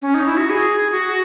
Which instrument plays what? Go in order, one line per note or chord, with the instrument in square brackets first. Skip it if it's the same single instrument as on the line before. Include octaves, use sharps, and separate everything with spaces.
[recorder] C#4
D#4
E4
F#4
G#4
F#4